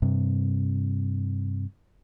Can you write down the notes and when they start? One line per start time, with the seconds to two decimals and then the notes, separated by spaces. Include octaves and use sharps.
0.02 G2 C3